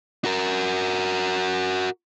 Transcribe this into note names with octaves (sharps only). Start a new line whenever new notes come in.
F#4 A#4